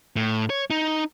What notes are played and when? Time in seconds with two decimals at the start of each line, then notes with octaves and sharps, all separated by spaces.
0.16 A2
0.50 C#5
0.70 D#4